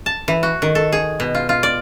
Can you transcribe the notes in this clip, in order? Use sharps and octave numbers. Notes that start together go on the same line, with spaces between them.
A5
E3
F#4
D#3
A4
G#4
B2
F4
F4
D5